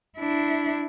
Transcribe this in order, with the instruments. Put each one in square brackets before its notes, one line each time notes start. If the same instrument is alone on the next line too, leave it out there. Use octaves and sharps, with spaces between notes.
[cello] D4 E4